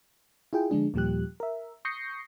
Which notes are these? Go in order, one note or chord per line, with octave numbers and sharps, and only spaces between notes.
E4 F4 G#4 G5
D3 F3 G#3 D4 G#4
D#2 A#2 F3 G3 G4 F#6
A#4 E5
C#6 D#6 G6 A#6 C7 C#7